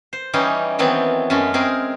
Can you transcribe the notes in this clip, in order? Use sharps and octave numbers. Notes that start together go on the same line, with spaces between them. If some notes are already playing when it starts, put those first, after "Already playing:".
C5
E3 G3 C#4 D#4 G#4
D#3 E3 F#3 B3 C4
F#2 G#3 A3 C#4
G#3 C4 G#4 A#4